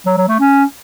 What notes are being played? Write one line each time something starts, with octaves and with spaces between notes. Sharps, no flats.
F#3
F#3
A3
C#4